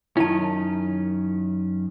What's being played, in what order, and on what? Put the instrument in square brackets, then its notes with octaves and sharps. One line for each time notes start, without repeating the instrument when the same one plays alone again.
[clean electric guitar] F#2 D#3 C#4 [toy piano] E4 A5